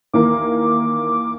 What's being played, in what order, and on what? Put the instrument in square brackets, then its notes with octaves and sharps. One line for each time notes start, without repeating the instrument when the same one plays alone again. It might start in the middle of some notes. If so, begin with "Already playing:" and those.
[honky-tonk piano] D#2 E3 A#3 [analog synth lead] D6